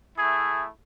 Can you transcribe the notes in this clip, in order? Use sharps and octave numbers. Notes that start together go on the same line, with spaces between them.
A3 E4 G#4